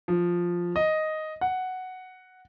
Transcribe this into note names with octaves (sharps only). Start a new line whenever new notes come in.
F3
D#5
F#5